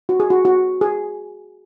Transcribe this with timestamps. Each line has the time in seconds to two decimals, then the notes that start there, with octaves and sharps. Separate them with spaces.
0.09 F#4
0.20 G#4
0.30 F#4
0.45 F#4
0.81 G#4